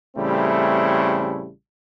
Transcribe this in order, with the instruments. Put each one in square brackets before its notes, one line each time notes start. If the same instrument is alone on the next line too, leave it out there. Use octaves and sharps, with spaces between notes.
[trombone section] A1 C#3 G3 A3 C4 E4